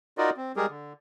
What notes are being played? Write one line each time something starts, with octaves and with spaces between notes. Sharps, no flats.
D#4 F4 F#4 A#4 D5 D#5
C4
G3 G#3 G4 G#4 A#4
D3